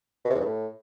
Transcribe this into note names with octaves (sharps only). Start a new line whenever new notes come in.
B2
C3
E2
G2
A2